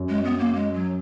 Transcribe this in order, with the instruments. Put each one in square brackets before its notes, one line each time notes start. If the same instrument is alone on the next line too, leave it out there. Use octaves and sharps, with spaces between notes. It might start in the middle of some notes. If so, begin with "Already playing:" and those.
Already playing: [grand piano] F#2
[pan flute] G#3
B3
A#3
G#3
F#3